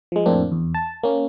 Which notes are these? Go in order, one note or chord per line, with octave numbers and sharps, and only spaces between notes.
F3 G#3
F2 A2 A#3 C4 D4
E2
A5
A#3 C#4